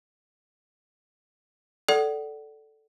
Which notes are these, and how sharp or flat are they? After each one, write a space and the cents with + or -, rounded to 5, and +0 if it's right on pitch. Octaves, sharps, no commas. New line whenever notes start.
A4 +0 D5 -10 F#5 +30